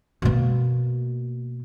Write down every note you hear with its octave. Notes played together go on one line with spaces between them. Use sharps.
B2 A#3